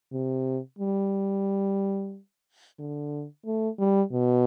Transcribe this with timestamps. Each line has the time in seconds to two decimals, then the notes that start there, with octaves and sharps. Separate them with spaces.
0.13 C3
0.79 G3
2.79 D3
3.46 A3
3.79 G3
4.12 B2